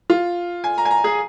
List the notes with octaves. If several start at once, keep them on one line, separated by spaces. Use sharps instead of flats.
F4
G#5
A#5
G#5
A#5
G#4